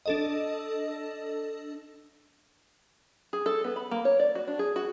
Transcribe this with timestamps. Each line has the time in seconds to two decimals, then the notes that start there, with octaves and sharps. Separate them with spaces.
0.06 D4 A4 D#5
3.33 G#4
3.46 A4
3.64 B3
3.76 B5
3.91 A#3
4.05 C#5
4.20 D5
4.35 F#4
4.47 D4
4.59 G#4
4.76 F#4